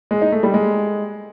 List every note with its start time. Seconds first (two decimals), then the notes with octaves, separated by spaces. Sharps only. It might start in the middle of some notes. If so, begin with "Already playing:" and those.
0.11 G#3
0.22 D#4
0.32 A3
0.43 G3
0.54 G#3